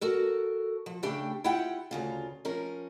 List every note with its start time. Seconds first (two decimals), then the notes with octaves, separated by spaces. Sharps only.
0.01 F#4 A4 A#4
0.86 F3
1.03 C#3 A3 D4 G4 G5
1.44 E4 F4 G4 F#5 G5
1.91 D2 C#3 F4
2.45 F3 C#4 A#4